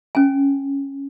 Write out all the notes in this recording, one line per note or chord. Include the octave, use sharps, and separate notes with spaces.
C#4 G#5